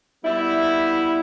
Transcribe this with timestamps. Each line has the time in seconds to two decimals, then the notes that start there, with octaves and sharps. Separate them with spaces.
0.24 G3 B3 E4